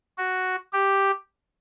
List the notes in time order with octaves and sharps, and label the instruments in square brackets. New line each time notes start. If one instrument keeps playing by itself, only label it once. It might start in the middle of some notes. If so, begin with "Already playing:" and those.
[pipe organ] F#4
G4